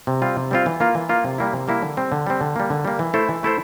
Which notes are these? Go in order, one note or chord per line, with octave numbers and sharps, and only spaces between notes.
C3
G3 C4 F4
C3
G3 C4 F4
E3
A#3 F4
E3
A#3 F4
C3
G3 A#3 E4
C3
G3 A#3 E4
D3
G3 C4
D3
G3 C4
D3
G3 A#3
D3
G3 A#3
E3
A3 E4 A4 C5
E3
A3 E4 A4 C5